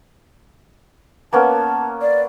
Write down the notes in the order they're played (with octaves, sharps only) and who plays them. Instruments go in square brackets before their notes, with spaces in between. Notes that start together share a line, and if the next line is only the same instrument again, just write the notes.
[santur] A#3 B3 C#4 [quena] A5
[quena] D5